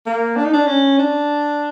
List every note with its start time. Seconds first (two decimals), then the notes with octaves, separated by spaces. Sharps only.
0.06 A#3
0.36 D4
0.45 D#4
0.53 D4
0.67 C#4
0.99 D4